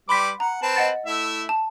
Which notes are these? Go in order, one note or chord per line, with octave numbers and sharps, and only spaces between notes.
G3 B4 B5 C6 D6 B6
F#5 A#5
C4 B4 A5
D#5 F#5 A6
A3 E4 E5
A5